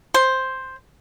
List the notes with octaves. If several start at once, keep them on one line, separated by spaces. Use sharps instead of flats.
C5